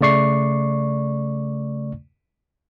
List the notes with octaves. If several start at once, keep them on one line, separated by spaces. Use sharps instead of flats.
C#3 A3 D5 C#6 C7